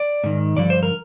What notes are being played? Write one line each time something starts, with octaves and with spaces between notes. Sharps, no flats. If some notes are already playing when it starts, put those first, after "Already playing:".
Already playing: D5
G#2 D#3
G2 D3 F3 D5
C5
A#4